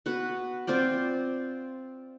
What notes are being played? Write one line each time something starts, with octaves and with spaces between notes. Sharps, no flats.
B3 F#4 B4
C4 F4 C5 D5